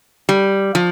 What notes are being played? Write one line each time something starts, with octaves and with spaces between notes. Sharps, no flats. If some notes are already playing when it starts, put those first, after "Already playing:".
G3
F3